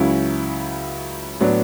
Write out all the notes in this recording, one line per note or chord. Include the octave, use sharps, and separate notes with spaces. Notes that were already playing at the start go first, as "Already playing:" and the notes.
Already playing: C#2 C#3 F#3 C#4 E4
A2 F#3 B3 D4